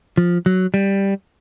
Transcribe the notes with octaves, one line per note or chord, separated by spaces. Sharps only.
F3
F#3
G3